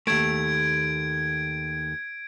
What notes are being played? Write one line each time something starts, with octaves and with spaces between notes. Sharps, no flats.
D#2 A3 G#6 D7